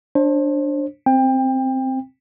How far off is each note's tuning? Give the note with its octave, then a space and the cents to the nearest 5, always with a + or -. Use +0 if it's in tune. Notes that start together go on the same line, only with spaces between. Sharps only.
D4 +0 C5 +35
C4 +0 G5 +25